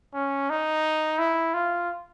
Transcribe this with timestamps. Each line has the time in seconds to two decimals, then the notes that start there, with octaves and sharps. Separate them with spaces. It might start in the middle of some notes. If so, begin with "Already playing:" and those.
0.14 C#4
0.50 D#4
1.19 E4
1.54 F4